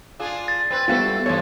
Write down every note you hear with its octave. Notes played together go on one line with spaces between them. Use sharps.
D4 F4 G#4
A6
C4 B4
G3 A3 B3 C4 F4 A4
G2 E3 F3 D4 C#5